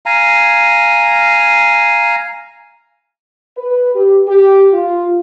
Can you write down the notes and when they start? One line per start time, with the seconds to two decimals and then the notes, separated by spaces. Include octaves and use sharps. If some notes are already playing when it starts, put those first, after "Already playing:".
0.06 F5 G#5 A#5
3.57 B4
3.95 G4
4.28 G4
4.73 F4